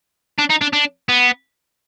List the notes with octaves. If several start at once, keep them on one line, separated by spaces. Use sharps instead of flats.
D4
D#4
D4
D4
B3